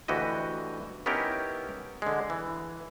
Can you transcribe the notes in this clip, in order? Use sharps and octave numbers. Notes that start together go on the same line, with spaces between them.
D2 E3 F#4 G4 D#5
B3 C#4 D#4 E4 G4 A#4
D3 G#3
E3